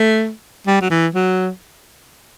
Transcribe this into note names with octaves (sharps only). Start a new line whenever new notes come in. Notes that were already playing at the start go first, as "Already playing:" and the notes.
Already playing: A3
G3
F#3
E3
F#3